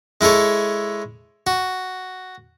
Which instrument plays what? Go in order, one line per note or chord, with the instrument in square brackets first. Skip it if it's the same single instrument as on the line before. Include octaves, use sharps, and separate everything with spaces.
[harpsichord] G#3 E4 G#4 A4 C#5
F#4